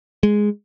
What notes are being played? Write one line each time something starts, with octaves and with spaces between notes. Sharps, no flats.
G#3